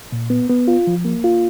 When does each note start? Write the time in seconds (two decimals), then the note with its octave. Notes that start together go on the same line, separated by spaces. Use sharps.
0.12 A#2
0.30 B3
0.50 B3
0.68 F4
0.87 F3
1.05 A#3
1.24 F4